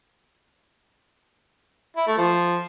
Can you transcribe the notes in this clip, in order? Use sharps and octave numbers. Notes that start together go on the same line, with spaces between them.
E4
A3
F3